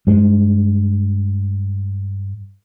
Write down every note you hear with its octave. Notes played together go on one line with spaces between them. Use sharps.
G2 G#3